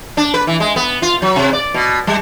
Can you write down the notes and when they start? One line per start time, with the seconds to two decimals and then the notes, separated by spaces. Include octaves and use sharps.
0.17 D4
0.34 B4
0.47 E3
0.60 G#3
0.76 B3
1.02 F4
1.22 F#3
1.36 C3
1.53 D5
1.74 B2
2.07 G3